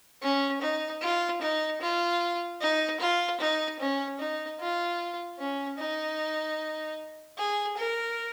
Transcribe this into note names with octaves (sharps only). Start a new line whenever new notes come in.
C#4
D#4
F4
D#4
F4
D#4
F4
D#4
C#4
D#4
F4
C#4
D#4
G#4
A#4